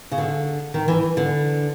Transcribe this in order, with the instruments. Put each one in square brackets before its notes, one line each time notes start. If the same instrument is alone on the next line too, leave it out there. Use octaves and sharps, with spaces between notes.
[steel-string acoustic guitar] C#3
D3
D#3
E3
D3